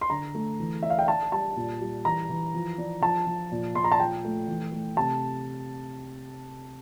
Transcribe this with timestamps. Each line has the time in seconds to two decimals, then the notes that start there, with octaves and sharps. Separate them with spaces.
0.01 C6
0.10 D3 A#5
0.35 A3
0.59 E3
0.83 D4 E5
0.90 F5
0.99 G5
1.08 D4 A5
1.32 G3 A5
1.56 A#2
1.81 G3
2.05 E3 A#5
2.30 E3
2.54 F3
2.78 D4
3.02 F3 A5
3.26 F3
3.52 A#2
3.75 A#2 C6
3.84 A#5
3.92 A5
3.99 F3 G5
4.24 A3
4.48 E3
4.72 A3
4.97 C3 A5